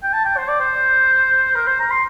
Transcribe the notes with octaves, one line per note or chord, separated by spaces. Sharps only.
G5
A5
G5
C5
D5
C5
A#4
C5
A#5
C6